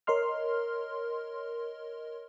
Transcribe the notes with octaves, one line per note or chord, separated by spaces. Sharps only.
A#4 C#5 D#5 C6 F6